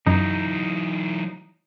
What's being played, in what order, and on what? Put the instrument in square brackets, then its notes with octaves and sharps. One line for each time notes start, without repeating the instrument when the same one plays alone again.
[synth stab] F#2 [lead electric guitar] E3 F#3 [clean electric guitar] D#4